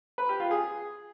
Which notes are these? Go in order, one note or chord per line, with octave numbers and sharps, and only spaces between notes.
B4
G4
F4
G#4